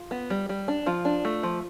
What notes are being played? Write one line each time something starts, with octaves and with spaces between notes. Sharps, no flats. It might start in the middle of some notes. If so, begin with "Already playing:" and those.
Already playing: F4
B3
G3
G3
D4
F3 F4
D4
A3
F3